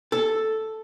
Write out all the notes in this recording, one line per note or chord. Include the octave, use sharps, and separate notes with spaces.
A4